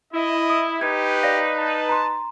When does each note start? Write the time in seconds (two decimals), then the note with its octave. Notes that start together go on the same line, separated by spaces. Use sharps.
0.13 E4 D#5
0.50 D#6
0.81 D#4 G4 B4 G#6
1.23 D5 F5 A#6
1.58 A5
1.89 A#5 C6